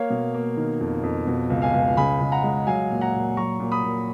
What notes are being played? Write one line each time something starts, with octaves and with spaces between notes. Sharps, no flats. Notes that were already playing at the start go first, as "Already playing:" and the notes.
Already playing: A#3 C#5 F5
B2
A#3
D#3
F2
F2
B2
C#2
F5 G#5
C#2
C#3 G#5 B5
C#2
F#5 A#5
G#3
F#3 F5 G#5
A#2
F#5 A#5
A#2
F#3 A#5 C#6
A#2
B5 D#6
A#2